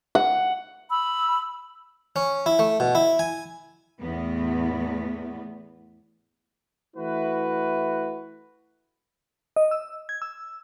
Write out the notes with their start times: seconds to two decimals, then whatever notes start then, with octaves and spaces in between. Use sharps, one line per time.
0.15 F#5
0.90 B5 E6
2.16 C#4
2.46 E4
2.59 A3
2.80 B2
2.95 E4
3.19 G#5
4.01 E2 A2 B3
6.96 E3 A3 E4 F#4 B4
9.56 D#5
9.71 E6
10.09 G#6
10.22 E6